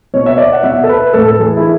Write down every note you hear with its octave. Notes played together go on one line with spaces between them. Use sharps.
B2 C#5
E5
D5
F#5
B2 E5
A4
B4
A2 A4
A4
E3 G#4
E4